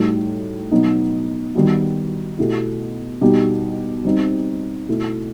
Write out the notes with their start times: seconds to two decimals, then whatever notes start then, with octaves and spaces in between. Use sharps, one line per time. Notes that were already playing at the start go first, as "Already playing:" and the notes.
Already playing: A2 G3 D#4 F#4
0.71 B2 F#3 B3 D#4
1.55 D#3 G3 B3 F#4
2.38 B2 A3 E4 G4
3.21 B2 G3 B3 D#4 G4
4.05 G3 C4 D#4
4.88 B2 A3 E4